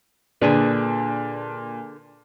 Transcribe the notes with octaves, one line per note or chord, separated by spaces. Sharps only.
A#2 D3 D4 G#4 B4